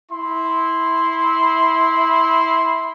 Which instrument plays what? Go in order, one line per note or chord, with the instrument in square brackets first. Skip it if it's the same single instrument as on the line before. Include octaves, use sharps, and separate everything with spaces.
[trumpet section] E4 C6